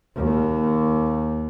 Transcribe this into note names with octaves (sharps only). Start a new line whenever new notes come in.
D#2